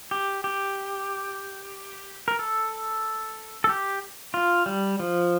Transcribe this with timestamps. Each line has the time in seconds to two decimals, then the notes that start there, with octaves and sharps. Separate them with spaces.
0.11 G4
0.44 G4
2.28 A#4
2.39 A4
3.64 A4
3.69 G4
4.34 F4
4.66 G3
4.99 F3